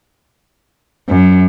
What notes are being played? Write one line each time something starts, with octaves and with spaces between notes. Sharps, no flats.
F#2